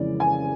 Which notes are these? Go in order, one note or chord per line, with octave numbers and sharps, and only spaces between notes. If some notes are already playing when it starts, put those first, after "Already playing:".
Already playing: F2 C#3 E3 G#3 C#4 D5
G#5